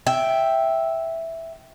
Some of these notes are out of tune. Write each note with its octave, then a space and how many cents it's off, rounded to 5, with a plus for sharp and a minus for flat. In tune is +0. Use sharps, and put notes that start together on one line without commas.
E5 +0 G5 +0